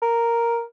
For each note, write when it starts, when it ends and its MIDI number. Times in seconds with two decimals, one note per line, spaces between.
0.02 0.63 70